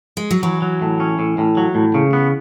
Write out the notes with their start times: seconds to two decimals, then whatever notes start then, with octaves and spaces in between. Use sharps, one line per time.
0.17 G#3
0.31 F#3
0.43 E3 F#3
0.62 F#3
0.82 A2
1.00 C#4
1.19 A2
1.38 A2
1.57 F#3
1.75 A2
1.94 C#3
2.13 B3